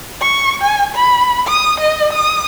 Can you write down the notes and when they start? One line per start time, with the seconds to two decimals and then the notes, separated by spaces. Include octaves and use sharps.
0.21 C#6
0.62 G#5
0.94 B5
1.48 D#6
1.80 D#5
2.13 D#6